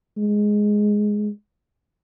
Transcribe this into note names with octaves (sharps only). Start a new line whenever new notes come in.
G#3